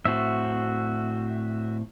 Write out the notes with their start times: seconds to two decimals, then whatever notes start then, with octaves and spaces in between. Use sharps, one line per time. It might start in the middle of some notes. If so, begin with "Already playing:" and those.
0.05 A2 C4 F#4 E5